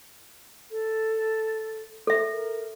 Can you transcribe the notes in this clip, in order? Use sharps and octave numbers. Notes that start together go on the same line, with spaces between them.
A4
A4 E5
A#4